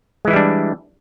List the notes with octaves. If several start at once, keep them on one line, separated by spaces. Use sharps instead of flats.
E3 G3 G#3 D4 E4